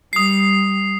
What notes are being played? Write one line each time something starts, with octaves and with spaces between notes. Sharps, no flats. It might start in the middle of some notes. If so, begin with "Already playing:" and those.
G3 D#6 C7